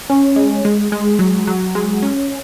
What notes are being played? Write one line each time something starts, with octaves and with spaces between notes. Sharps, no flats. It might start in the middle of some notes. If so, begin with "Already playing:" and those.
C#4
G#3
G#3
G#3
F#3
F#3
G#3
C#4